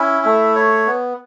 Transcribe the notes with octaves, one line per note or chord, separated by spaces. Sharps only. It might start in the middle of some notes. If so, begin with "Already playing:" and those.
Already playing: C#4 E4
A3
C#5
B3